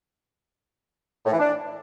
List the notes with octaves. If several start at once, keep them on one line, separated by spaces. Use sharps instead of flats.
A2
E3
D4